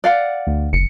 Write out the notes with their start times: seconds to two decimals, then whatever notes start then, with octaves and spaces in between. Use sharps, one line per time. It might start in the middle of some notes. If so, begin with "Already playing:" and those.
0.04 D5 F5 F#5
0.47 D2
0.73 F#1 C#7